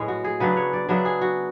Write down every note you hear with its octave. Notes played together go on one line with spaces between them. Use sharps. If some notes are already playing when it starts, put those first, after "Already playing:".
Already playing: A2 G#3 C#4 B4
F#4
G#4
C#3 F#3 B3 D4 B4
C#5
D5
C#3 F#3 B3 D4 E5
G#4
F#4